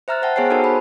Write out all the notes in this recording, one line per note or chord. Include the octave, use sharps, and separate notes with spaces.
C5 E5 A#5 F6 F#6 A6
C5 E5 F#5 G5 A5
B3 G#4 C5 C#5 G#5 C7
D#4 F#4 A4 A#4 C5 A5
B5